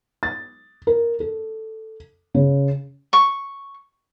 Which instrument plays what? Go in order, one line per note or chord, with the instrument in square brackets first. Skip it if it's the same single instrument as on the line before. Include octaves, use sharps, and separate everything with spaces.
[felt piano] A6
A#4
A4
C#3
[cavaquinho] C#6